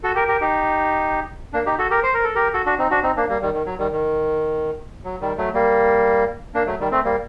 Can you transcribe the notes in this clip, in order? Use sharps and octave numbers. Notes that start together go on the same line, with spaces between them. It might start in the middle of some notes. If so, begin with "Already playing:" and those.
F#4 A4
G4 A#4
G4 A#4
D#4 G4
A#3 D4
D#4 G4
F#4 A4
G4 A#4
C5
A#4
A4
G4 A#4
F#4 A4
D4 F#4
C4 D#4
D4 F#4
C4 D#4
A#3 D4
G3 A#3
D#3 G3
D#3
F#3
D#3 G3
D#3
F#3
D#3 G3
F#3 A3
G3 A#3
A#3 D4
F#3 A3
D#3 G3
A3 C4
G3 A#3